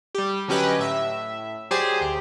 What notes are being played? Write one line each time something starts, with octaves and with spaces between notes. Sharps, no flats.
G3 G4
D3 F#3 C#4 G4 B4 D#5
A2 E5
F#3 G4 G#4 C5 D5 D#6
D2 G4